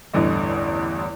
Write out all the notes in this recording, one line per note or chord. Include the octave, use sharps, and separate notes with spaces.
A1 E2 G2 D3 D#5